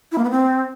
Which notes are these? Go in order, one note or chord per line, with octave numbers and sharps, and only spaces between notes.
E4
A#3
B3
C4